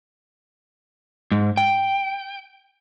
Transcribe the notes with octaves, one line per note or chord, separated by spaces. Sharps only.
G#2
G5